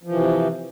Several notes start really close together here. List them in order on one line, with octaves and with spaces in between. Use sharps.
F3 E3 C3